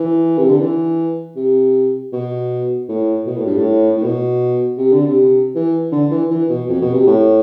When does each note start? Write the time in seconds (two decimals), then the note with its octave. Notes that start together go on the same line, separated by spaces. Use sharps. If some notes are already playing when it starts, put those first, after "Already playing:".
Already playing: E3
0.38 C3
0.49 D3
0.60 E3
1.36 C3
2.13 B2
2.89 A2
3.26 B2
3.36 A2
3.46 G2
3.57 A2
3.96 A2
4.03 B2
4.78 C3
4.92 D3
5.05 C3
5.55 E3
5.92 D3
6.11 E3
6.30 E3
6.49 B2
6.69 F2
6.82 B2
6.94 C3
7.07 A2